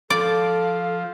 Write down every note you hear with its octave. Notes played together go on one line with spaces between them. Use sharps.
F3 A4 D5 F5